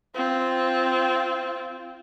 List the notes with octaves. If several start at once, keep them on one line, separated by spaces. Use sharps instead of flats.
C4 F4